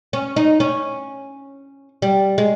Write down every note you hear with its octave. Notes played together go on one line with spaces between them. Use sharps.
C#4
D#4
C#4
G3
G#3